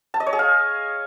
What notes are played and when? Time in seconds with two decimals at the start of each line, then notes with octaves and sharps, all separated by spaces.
0.14 A5
0.20 D#5
0.26 C#5
0.33 G#4
0.39 F5